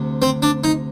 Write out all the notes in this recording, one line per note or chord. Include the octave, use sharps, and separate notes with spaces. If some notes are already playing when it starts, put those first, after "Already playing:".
Already playing: D2 C3
C4
D4
D#4